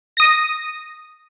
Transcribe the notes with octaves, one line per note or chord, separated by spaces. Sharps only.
D#6 A#6